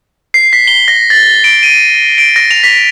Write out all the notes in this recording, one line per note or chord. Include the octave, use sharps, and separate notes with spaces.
C7
B6
G7
A#6
A6
D7
D#7
D7
A#6
F7
B6